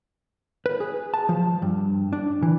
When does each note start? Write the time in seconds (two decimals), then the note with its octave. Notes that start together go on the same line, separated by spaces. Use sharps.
0.66 B4
0.80 G#4
1.14 A5
1.29 F3
1.62 G2
2.13 D4
2.42 E3